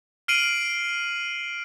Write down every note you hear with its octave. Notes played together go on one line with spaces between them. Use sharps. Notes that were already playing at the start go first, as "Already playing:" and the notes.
F6 C7 D7 D#7 F#7